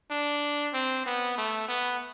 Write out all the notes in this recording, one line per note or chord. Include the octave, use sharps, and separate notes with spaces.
D4
C4
B3
A3
B3